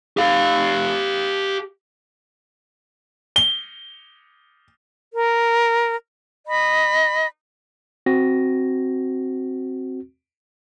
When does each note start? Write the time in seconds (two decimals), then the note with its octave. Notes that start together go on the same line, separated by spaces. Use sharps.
0.17 G4 F5
3.36 G7
5.14 A#4
6.49 D#5 B5
8.06 C4 F#4 A#6